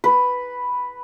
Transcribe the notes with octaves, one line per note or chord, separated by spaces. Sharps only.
B4